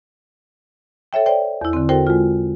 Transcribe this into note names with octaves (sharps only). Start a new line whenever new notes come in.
A4 C#5 E5 G5
C5 D5 G5
E2 E4
D3 C4
F#4 A4 A#4 C5 G5
G#3 F4